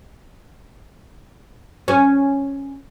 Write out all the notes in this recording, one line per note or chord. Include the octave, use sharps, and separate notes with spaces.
C#4